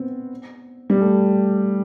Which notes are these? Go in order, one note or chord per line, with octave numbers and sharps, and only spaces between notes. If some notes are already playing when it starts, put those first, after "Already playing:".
Already playing: B3 C4
G3
A3